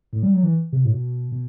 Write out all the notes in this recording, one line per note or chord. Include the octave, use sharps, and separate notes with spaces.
A2
G3
F#3
E3
C3
A2
B2
B2